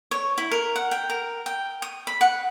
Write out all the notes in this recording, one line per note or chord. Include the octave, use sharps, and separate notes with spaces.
C#5
E4
A#4
F#5
G5
A#4
G5
D#6
B5
F#5